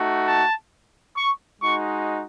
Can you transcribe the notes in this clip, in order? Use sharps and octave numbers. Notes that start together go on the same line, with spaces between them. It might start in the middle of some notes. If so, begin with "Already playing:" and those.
Already playing: A3 D#4 F#4
A5
C#6
G#3 D#4 F#4 C#6